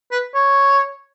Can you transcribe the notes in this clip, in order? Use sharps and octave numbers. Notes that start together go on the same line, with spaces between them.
B4
C#5